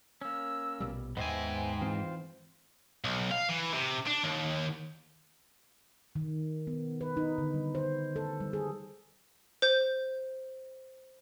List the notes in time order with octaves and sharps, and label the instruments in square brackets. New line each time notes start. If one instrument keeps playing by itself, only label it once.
[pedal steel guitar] A#3 C#4 [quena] E6
[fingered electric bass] A#1 B2 G3
[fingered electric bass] D#2 D#3 [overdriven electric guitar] G#2 G#5 [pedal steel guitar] B3 C5 E5 [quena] G5
[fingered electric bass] E3 C4 [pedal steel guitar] F4 C5
[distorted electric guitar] B1
F5
E3
C3
D4
D#2
[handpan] D#3
B3
B4
D#4
D3
G3
C5
A4
G3
G#4
[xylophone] C5 G6